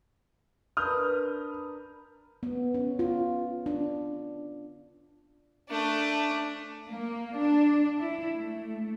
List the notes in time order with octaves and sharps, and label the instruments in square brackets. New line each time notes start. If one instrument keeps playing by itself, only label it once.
[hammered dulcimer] D4 A#4 B4 [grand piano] D#6 F6 G6
[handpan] B3
C#4
F4
D4
[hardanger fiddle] A3 D4
[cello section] A#3
D4
E4
A3